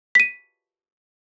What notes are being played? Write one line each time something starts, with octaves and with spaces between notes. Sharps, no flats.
B6 D#7